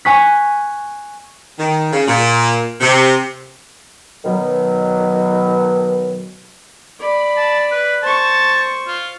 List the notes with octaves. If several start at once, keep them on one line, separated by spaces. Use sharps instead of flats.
G#5 C#6 F#6 B6
D#3
C#3
A#2
C3
B2 D#3 F#3
D5 B5
A5
B4
C5 A5 C#6
F4